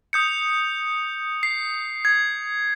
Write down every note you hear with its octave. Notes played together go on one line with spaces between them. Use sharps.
D#6 G6 C#7
C7
G#6